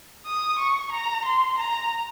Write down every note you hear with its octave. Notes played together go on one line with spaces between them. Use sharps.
D#6
C#6
A#5
C6
A#5